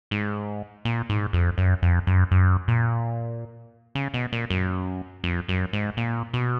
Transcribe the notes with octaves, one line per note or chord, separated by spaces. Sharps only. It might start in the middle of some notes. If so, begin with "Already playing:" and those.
G#2
A#2
G#2
F2
F#2
F2
F#2
F#2
A#2
C#3
B2
A#2
F#2
F2
F#2
G#2
A#2
B2